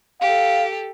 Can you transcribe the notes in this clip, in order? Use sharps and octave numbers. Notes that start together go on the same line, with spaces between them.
G4 A4 F5